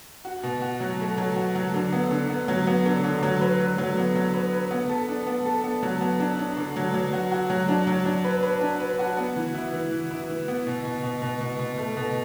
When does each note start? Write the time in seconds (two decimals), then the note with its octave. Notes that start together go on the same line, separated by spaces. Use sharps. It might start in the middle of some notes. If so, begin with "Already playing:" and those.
0.25 F#4
0.43 B2
0.62 F#4
0.80 F#3
1.00 A3
1.18 F#3
1.36 F#4
1.55 F#3
1.74 D3
1.93 B3
2.11 D3
2.30 B3
2.48 F#3
2.67 B3
2.86 D3
3.04 D3
3.23 F#3
3.41 B4
3.60 F#3
3.78 F#3
3.97 B3
4.16 F#3
4.34 B4
4.52 B4
4.71 B3
4.89 A4
5.09 D4
5.27 B3
5.46 A4
5.64 B3
5.83 F#3
6.01 B3
6.20 D4
6.39 D4
6.57 D3
6.76 F#3
6.94 F#3
7.13 F#4
7.32 F#4
7.50 F#3
7.69 D4
7.87 F#3
8.05 D4
8.24 B4
8.43 B4
8.61 D4
8.80 B4
8.99 F#4
9.17 B3
9.36 E3
9.54 E4
9.73 E3
9.92 E3
10.11 E4
10.29 E3
10.48 B3
10.67 B2
10.85 B2
11.03 B2
11.22 B2
11.41 B2
11.59 B2
11.78 A3
11.97 B2